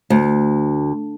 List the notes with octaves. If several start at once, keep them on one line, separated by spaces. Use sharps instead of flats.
D2